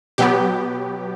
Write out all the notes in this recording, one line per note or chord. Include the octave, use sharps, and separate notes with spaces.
B2 F#3 B3 G4